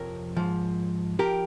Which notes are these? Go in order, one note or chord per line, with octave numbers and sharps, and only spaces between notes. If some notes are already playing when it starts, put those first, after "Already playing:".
Already playing: F2 C3 F3 A#4 C#5
G#2 F3
F3 G4 A#4